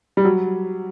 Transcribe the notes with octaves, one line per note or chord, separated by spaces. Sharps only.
G3
F#3